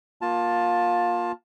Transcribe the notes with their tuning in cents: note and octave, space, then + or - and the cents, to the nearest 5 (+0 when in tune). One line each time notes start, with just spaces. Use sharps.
A#3 +15 F4 +20 A5 +0